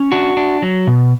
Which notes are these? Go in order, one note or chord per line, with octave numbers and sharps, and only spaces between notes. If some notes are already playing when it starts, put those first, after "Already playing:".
Already playing: C#4
D4 F#4
D4
F#3
B2